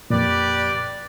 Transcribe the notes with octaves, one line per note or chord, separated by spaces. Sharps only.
F2 A#2 G4 B4 D5